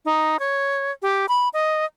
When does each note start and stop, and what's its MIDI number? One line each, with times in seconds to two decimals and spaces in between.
0.05 0.39 63
0.39 0.92 73
1.02 1.26 67
1.29 1.49 83
1.53 1.85 75